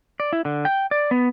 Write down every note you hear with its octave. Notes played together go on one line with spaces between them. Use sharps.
D5
E4
D3
G5
D5
B3